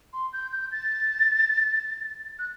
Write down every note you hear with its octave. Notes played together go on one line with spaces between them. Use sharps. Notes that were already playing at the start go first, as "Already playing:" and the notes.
C6
G6
G6
A6
F#6